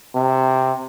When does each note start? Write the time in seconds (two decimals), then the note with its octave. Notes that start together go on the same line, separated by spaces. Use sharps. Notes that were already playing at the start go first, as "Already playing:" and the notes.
0.15 C3